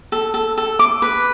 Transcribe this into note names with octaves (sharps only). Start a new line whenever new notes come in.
A4
A4
A4
D6
B4